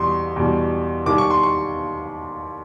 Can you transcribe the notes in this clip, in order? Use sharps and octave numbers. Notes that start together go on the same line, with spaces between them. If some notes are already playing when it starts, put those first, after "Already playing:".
Already playing: E2 B2 G3 C6 C#6
E2 B2 G3
D#2 D#3 G3 D6
C#6
C6
C#6